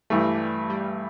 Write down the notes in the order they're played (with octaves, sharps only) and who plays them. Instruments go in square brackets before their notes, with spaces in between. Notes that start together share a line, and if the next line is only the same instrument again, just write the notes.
[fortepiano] G2 E3 A3 [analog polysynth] G3
[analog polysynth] G3